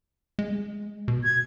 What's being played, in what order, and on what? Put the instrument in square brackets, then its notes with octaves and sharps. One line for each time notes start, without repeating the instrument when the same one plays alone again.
[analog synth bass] G#3
B2
[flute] G#6